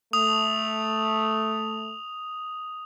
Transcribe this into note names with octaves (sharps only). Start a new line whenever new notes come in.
A3 D#6 F7